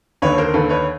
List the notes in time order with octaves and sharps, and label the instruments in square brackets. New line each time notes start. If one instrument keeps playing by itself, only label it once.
[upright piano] D#2 D3 B4 C#5
A#4 C5
D#2 D3 A4 B4
B4 C#5